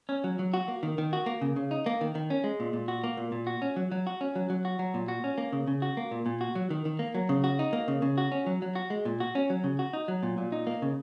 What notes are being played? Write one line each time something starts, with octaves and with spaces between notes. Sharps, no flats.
C#4
F#3
F#3
F#4
A#3
D#3
D#3
F#4
A#3
C#3
C#3
D#4
A#3
D#3
D#3
C#4
G#3
A#2
A#2
F#4
A#3
A#2
A#2
F#4
C#4
F#3
F#3
F#4
C#4
F#3
F#3
F#4
F#3
A#2
F#4
C#4
A#3
C#3
C#3
F#4
A#3
A#2
A#2
F#4
F#3
D#3
D#3
A#3
F#3
C#3
F#4
D#4
A#3
C#3
C#3
F#4
C#4
F#3
F#3
F#4
G#3
A#2
F#4
C#4
F#3
C#3
F#4
D#4
F#3
A#2
A#2
D#4
A#3
C#3